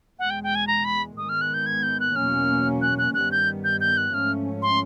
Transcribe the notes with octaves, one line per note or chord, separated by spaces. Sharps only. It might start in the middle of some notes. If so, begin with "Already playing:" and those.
E2 B2 G#3 F#5
G5
G5
G#5
A#5
B5
G#2 D#3 G#3 B3 D#6
F6
F#6
G6
G#6
G6
F#6
E2 B2 F#3 A#3 C#4 F6
F#6
F#6
G2 D#3 G3 B3 F#6
G6
G6
G6
F#6
G#2 F3 A3 C#4 F6
C6